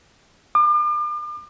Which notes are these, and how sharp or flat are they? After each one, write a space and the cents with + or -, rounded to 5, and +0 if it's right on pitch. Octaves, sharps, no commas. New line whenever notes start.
D6 +40